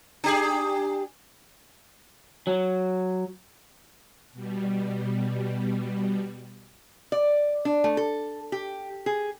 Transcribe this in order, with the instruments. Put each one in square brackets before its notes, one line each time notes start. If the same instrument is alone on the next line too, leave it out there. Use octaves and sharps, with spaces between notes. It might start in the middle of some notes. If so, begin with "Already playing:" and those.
[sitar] D4 G4 G#4
[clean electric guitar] F#3
[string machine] B2 G3
[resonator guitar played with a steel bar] D5
D4
A3
A4
G4
G#4